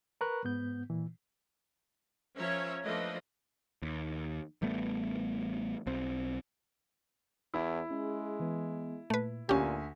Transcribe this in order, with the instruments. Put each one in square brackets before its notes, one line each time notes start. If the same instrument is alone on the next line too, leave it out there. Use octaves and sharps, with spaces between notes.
[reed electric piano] A#4 B4 A#5 B5 C#6 F#6
G#2 B3 G6
A#2 E3
[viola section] F3 C#4 A#4 C#5 E5
F3 A3 A#3 D4 B4 D#5
[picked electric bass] D#2
A1 G3 A3 B3
B1 C4
[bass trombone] E2 [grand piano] E4
[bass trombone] G#3 [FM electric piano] C#4 G#4
[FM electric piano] E3 B3
[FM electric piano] A#2 [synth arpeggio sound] A3 B4
[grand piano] D2 G#5 [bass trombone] A#2 [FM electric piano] D3 B6 [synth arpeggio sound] C#4 G4